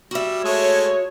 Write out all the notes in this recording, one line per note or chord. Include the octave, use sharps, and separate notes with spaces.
G3 F#4 E5
G#3 A3 C#5